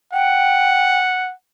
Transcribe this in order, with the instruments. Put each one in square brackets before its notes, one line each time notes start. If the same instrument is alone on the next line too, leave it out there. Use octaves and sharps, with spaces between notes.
[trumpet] F#5 [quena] G5